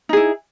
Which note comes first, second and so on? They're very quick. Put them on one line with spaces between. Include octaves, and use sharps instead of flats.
D#4 G#4 E4